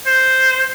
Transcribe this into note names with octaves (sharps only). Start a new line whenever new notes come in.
C5